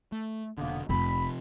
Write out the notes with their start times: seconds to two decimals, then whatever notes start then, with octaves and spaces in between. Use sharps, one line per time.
0.12 A3
0.58 F1 B2 D3 A#3 B3
0.89 F1 C3 F3 B5